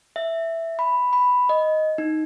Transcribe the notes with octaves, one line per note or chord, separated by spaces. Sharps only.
E5
B5
B5
D#5
D#4